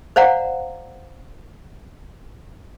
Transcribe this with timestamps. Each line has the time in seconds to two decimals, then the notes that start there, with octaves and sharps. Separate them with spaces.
0.16 C5 D5 F5 F#5 A#5